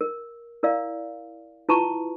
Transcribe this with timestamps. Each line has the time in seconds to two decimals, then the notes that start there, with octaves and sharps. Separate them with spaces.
0.01 A#4
0.63 E4 A#4 D5 F5
1.69 E4 F4 B4 A5 A#5 C#6